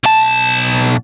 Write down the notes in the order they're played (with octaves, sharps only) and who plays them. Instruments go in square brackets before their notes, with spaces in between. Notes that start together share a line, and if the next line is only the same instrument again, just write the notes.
[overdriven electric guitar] B1 A5